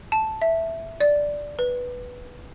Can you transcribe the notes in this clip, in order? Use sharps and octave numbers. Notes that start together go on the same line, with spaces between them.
A5
E5
D5
B4